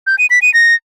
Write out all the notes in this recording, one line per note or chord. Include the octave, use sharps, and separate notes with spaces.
G6
D#7
B6
D#7
A#6